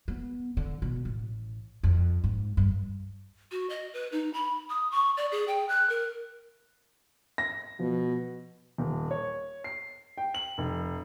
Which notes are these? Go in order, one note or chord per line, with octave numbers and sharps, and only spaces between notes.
B3
D3
B2
A1
F2
G#2
G2
F#4
D#5
B4
D#4
B5
D#6
C#6
D5
G#4
G5
F#6
A#4
A#6
B2 F3
D#1
C#5
C7
G5
F#7
F1